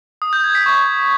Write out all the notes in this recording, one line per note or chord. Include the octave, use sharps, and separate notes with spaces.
D#6
G6
G#6
B6
C#6